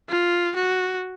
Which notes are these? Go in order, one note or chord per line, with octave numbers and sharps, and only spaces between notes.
F4
F#4